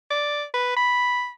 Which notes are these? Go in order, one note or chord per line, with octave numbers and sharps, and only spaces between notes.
D5
B4
B5